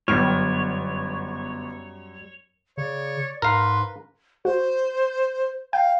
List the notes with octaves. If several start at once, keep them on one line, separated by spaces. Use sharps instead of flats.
G1 F#2 G3 B3 C#5 F6
C#3 C#5 D5
G#2 A#4 B4 F5 C6
F#4 C5
F5 G5